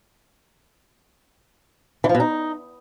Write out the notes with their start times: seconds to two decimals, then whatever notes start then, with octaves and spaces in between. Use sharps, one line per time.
2.04 E3
2.09 F3
2.15 B2
2.20 D#4